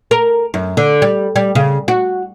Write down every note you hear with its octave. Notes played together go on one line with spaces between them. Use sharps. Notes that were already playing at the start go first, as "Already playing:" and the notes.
A#4
F#2
D3
G3
G3
C#3
F#4